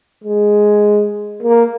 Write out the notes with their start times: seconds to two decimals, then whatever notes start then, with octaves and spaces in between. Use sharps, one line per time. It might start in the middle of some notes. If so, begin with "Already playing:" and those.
0.24 G#3
1.43 A#3